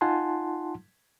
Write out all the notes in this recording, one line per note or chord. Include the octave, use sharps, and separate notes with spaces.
D#4 F4 F#5 G#5 A5 C6